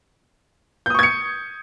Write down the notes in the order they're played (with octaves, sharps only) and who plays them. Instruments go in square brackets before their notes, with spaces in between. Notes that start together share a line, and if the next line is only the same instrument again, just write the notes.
[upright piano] G6
D#6
C#6
G#6
C#7